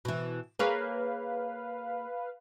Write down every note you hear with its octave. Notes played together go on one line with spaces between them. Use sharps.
B2 E3
A#3 G#4 B4 C#5 F5